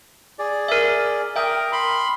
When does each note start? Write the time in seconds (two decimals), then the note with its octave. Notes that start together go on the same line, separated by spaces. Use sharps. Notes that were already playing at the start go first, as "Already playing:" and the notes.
0.39 G#4 D5
0.68 A#4 E5
1.36 A#4 E5 G5 D#6
1.72 B5 C6